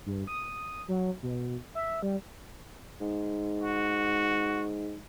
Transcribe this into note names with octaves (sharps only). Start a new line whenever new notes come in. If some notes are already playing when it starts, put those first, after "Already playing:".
G2
D#6
F#3
B2
E5
G3
G#2
F#4